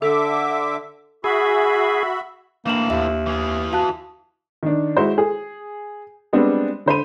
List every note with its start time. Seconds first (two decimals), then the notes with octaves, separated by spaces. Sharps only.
0.02 D3 A4 E5 D6
1.24 F#4 G#4 E5 B5
2.66 A2 E3 A#3 D4 F5 E7 F#7
2.90 D#2 E5
3.26 E3 G#4
3.73 F#4 F5 A5 F#6
4.63 D#3 D4
4.97 G#3 E4 F#4 C5
5.18 G#4
6.33 G3 G#3 B3 C4 D4
6.86 D3 C5 B5 D#7